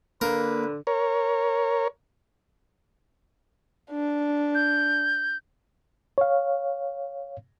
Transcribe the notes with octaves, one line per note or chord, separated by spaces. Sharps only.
D3 A#3 A#4 B4
A#4 C#5
D4
G6
C#5 F5